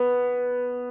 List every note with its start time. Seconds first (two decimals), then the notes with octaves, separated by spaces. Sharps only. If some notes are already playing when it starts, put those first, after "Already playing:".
Already playing: B3